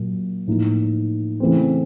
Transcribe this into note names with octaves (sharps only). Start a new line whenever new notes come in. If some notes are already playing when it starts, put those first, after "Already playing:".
Already playing: A#2 F#3 A#3
A2 F3 A#3 D#4
C#3 E3 A3 C4